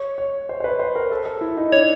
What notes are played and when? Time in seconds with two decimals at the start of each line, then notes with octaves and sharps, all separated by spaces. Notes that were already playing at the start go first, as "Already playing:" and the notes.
Already playing: C#5
0.18 C#5
0.49 C5
0.60 C5
0.64 B4
0.79 C5
0.95 A#4
1.11 A4
1.26 A4
1.41 E4
1.57 D#4
1.72 D4 C#5